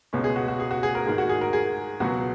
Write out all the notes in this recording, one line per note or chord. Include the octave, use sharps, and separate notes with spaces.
C#2 B2 G#3 C#4
G#4
F#4
F#4
G#4
F#4
G#4
A#4
G#2 D#3 A#3 G#4
F#4
G#4
A#4
G#4
C#2 B2 F#3 F#4